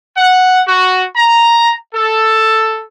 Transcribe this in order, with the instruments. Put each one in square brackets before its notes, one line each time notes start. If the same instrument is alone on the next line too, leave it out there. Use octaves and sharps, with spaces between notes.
[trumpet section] F#5
F#4
A#5
A4